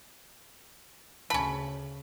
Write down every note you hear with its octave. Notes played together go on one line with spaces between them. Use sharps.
D2 C#3 C#4 A5 B5